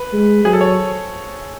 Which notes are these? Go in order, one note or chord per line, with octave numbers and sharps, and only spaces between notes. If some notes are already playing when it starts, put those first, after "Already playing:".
Already playing: B4
G#3
F#3 G#4
A4
C#5